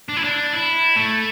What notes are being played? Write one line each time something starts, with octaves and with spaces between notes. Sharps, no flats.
D4
E4
D4
E4
A3